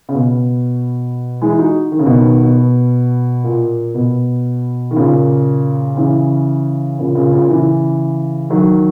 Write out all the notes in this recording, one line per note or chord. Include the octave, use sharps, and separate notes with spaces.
C#3
B2
E3 G#3
D#4 F#4
D#3
C#3
B2 D#3
B2
A#2
B2
D#3
A#2 C#3
C#3 E3
A#2 C#3
A#2 C#3
A#2 C#3
C#3 E3
D#3 F#3